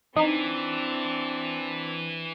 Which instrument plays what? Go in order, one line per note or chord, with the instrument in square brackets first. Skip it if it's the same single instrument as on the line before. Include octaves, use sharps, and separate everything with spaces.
[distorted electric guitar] E3 [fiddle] C4 D4 [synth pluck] D#4